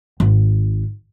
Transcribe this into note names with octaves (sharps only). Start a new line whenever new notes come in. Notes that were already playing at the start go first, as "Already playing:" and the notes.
G#1